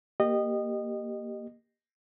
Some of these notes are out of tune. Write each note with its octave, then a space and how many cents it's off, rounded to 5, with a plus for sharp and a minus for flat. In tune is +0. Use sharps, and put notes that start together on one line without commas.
A#3 +0 G4 +0 D#5 -20